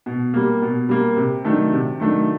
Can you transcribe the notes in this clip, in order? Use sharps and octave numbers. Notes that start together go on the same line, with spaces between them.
B2
G3 A#3
B2
G3 A#3
C3
D#3 F#3 A3 D4
C3
D#3 F#3 A3 D4